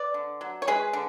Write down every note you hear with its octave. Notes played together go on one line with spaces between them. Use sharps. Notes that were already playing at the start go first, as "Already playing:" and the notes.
Already playing: B4 D5
D3
F#3
C#5
G#3 G#4 B4
D3